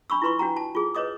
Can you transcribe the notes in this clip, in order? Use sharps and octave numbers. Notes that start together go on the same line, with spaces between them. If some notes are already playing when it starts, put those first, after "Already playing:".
D4 B5 C#6 E6
E4 F4 B4 C6 C#6
D4 F#4 G5 A#5
A5
F4 G#4
B4 C#5 D#5 D6 D#6